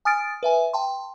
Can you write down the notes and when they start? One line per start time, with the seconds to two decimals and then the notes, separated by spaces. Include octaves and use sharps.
0.05 G#5 D#6 F6 A6 D7
0.43 B4 E5 G#5
0.73 G5 A5 C6